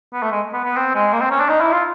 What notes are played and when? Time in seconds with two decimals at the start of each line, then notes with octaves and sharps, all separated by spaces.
0.13 B3
0.23 A3
0.32 G#3
0.53 B3
0.65 B3
0.76 C4
0.95 G#3
1.13 A#3
1.22 C4
1.31 C#4
1.40 D4
1.49 D#4
1.61 E4
1.72 F4